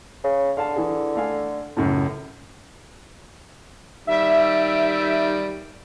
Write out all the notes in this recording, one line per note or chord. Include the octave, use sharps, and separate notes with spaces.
C#3
D3 F5 A5
E3 G#4
A3 F5 G#5
C#2 F#2 A2
D#3 G3 E5